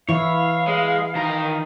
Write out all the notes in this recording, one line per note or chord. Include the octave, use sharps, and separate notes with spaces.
E3 E4 C#5 F5
G#3
D#3 A#5